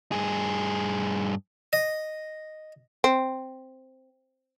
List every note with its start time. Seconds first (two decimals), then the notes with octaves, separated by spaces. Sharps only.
0.12 G2 G#4
1.73 D#5
3.04 C4